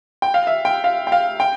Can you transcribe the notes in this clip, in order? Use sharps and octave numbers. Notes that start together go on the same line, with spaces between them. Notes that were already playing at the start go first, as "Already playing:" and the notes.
G5
F5
E5
G5
F5
G5
F5
G5